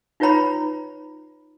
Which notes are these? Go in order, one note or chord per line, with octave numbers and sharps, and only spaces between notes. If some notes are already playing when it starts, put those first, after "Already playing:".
D#4 F4 B4 C#5 A#5 B5